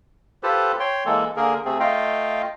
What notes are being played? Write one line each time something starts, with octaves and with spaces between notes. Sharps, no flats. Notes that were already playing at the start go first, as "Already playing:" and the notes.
F4 G4 A4 B4 C5
C#5 G5 C6
E3 G#3 A#3 A4
D3 A#3 G#4 A#4
C3 A3 C4 G#4
A3 F4 D#5 F5 G5